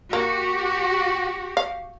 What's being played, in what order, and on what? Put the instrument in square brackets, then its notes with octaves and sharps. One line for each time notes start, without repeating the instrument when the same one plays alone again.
[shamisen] A#3 [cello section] F#4 G4
[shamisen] F5